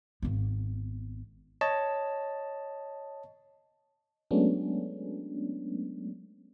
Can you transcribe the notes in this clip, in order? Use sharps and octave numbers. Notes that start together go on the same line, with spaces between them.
G#1 B3
C#5 D#5 A5
F#3 G#3 A3 B3 C#4 D4